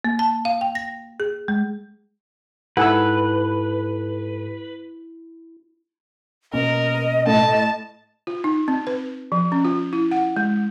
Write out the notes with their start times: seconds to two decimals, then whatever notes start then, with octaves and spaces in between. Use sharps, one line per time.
0.05 A#3
0.19 A5
0.45 F5
0.61 G5
0.75 A#6
1.20 G#4
1.48 G#3
2.77 G#2 E4 G4 A4 B4 F#5 G#5 E6
6.53 B2 A#3 C#4 A#4 D#5
7.27 A2 A5
8.27 F4
8.44 D#4
8.68 C4
8.87 B4
9.32 F3
9.52 C#4
9.65 F4
9.93 E4
10.11 F#5
10.36 G#3